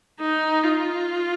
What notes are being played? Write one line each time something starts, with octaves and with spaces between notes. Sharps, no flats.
D#4
F4